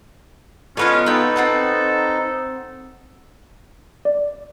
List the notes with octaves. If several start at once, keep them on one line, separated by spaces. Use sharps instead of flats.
D3 B3 C#4 F4 C#5 D#5
D#4 A4 B4 G5
C4 F#5 A5
D5